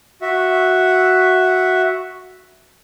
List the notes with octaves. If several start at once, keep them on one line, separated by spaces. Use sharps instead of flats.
F#4 E5